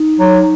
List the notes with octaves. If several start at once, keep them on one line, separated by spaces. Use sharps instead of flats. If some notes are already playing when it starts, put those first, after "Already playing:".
Already playing: D#4
F#3